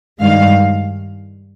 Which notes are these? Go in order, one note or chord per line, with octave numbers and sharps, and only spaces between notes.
G2 D#3 G#3 F5